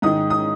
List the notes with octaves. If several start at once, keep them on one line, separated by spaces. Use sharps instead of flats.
G#2 D#3 G#3 D#6
D#6